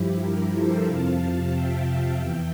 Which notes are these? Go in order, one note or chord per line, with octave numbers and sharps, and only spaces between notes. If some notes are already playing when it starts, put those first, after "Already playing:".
Already playing: G2 F3 E4 G4
G4 A#4
A4 C5
F2 C3 F3 F5 A5
E5 G5
E2 E3 E5 G5